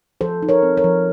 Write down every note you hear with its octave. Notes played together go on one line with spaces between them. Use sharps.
F3 A4 C5
D#4
A#4 C#5
C4
A#4 C#5
F3